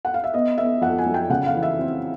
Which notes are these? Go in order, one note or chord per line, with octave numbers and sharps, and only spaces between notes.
F#5
F5
E5
B3 D#5
B3 E5
F2 F#5
G#5
F#3
G5
C#3 F#5
F5
E3
E5
C4